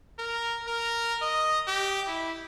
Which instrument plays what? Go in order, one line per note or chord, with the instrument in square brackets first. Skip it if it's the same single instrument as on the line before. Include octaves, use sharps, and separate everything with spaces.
[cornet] A#4
A#4
D#5
G4
E4